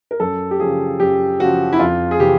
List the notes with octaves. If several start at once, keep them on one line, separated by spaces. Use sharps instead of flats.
A#4
F#2 A4
G4
C#3 F3 G#4
F#2 G4
C#3 F3 F#4
E4
F2 F4
G#4
C3 E3 G4